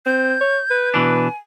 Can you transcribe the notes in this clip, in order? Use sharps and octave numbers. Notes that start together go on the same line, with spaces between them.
C4 G6
C#5
B4
B2 E3 D4 G#5